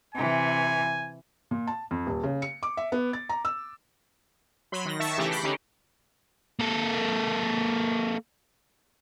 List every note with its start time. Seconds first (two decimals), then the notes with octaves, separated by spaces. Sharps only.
0.15 C3 E3 G#5
1.51 A#2
1.67 A5
1.91 F2
2.07 D#1
2.23 C#3
2.42 C#7
2.63 D6
2.77 E5
2.92 B3
3.13 A6
3.29 A#5
3.45 E6
4.72 F#3 B5 C6
4.85 D#3 A#6
4.99 D#3 E5 A5 C#6
5.18 C#3 E3 A3 G4 E5 A#6
5.31 B5 D6 F#6 G6 A#6 C7
5.43 D3 C#4 D#4 G4
6.59 A#3 A4